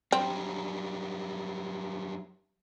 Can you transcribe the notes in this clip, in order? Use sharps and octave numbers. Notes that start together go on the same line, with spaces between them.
F#2 G3 C4